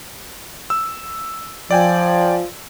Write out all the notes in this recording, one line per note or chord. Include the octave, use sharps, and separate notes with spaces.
E6
F3 D5 G5 G#5